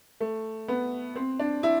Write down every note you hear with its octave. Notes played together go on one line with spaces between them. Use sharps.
A3
B3
C4
D4
E4